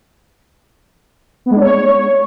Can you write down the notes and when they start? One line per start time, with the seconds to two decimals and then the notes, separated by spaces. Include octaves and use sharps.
1.46 B3
1.51 G#3
1.56 D4
1.61 C#5